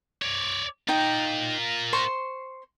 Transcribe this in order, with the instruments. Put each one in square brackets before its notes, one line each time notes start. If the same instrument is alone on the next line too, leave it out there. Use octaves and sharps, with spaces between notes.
[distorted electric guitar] C#5 D5
[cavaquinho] D#4 G5 [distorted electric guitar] F4 A#4
[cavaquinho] C5 C6 C#6